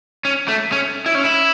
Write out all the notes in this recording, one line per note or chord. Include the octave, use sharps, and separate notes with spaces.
C#4
A3
C#4
E4
C#4
E4